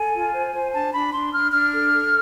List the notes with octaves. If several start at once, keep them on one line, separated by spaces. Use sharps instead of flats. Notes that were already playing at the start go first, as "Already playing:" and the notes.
Already playing: A4 G#5
F4
C5
C5
D4 A5
D4 B5
D4 C6
D4 F6
D4 F6
A4
A4